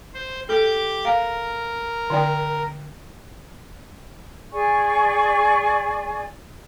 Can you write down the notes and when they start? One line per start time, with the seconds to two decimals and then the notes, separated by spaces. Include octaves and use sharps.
0.14 C5
0.49 G4 A4 D6 G6
1.05 A#4 F5
2.10 D3 D5 G5
4.52 G#4 D5 G#5 C#6